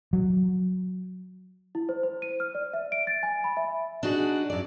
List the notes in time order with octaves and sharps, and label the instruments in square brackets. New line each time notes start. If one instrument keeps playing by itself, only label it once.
[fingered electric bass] F#3
[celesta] E4
C5
C5
D#7
F6
D5
E5
D7
A6
G#5
B5
E5
[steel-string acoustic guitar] D4 D#4 F#4 G#4
F#2 D5